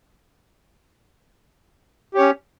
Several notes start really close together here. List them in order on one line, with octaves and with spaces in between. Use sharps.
G4 C#5 C#4